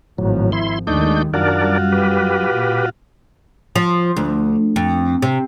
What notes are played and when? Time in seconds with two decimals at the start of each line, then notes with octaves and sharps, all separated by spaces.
0.18 G#1 A2 F3 F#3
0.52 E4 C6
0.87 D#2 D#3 G#3 A3 D4 D#4 G6
1.34 F#2 G3 D4 F4 F#4 A#4 D5
1.92 G4 B4
2.49 A#2
3.76 F3
4.17 D2
4.76 F2
5.22 C3